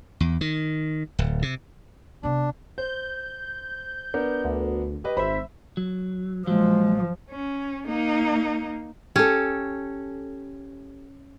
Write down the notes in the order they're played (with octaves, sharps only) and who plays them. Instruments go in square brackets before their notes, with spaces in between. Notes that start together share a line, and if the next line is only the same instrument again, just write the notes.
[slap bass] E2
D#3
D1
C3
[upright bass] C3 B3 [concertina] D4
[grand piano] C5 [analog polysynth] G6
[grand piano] B3 D4 A#4
[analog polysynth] D2
[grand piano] G4 B4 D#5
[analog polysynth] G#1 E5 [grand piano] C5 B5
[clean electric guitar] F#3
[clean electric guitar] A#2 F#3 [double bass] F3 [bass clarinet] G#3
[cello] C#4
A#3 D#4
[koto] C#4 [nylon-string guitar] G4 A4